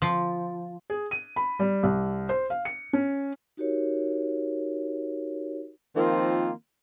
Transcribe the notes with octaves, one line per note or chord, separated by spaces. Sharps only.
F3
G#4
D#7
B5
G3
C2
C5
F5
C#7
C#4
D#4 F#4 G4 A#4 C#5
D#3 F3 A#3 C4 F4